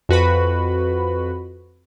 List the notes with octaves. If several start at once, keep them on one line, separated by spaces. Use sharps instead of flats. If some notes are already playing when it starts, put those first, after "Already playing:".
F2 F#4 B4 B5